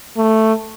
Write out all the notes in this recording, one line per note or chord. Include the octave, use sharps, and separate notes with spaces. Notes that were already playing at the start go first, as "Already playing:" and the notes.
A3